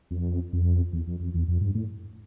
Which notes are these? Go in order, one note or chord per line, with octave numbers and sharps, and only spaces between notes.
F2
F2
E2
F2
F2
E2
F2
G2
A2